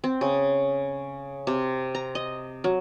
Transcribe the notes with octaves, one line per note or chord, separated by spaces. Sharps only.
C4
C#3
C3
A#5
D#5
F#3